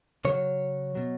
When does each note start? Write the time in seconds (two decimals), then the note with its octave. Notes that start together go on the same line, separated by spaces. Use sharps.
0.25 C#3 F#3 C#5
0.95 B2 F#3